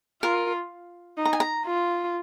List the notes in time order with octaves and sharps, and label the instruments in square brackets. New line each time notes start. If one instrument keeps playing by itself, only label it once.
[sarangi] F4 [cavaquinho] A#4
[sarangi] D#4
[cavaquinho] A#5
G#5
A#5
[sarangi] F4